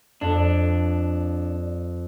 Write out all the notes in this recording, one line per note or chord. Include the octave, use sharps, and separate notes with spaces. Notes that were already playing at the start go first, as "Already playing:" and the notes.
F2 D4